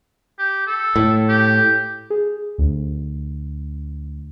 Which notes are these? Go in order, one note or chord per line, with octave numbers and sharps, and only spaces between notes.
G4
A4
A2
G4
G#4
D2